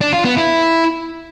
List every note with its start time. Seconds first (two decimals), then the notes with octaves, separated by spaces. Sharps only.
0.01 D4
0.13 F4
0.25 B3
0.37 E4